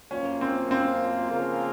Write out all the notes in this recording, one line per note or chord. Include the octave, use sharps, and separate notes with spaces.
F#2 F3 A#3 C#4 F4
C4
C4
C#3 F3 A#3 F4 A#4